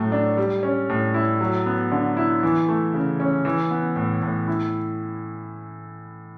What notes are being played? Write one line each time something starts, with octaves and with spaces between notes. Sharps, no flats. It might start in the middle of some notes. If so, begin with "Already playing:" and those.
Already playing: A2 F#3 A3
D4
G3
C#4
A2
E4
F#3
B3
D3
E4
E3
A3
C#3
C#4
E3
B3
A2
A2
E4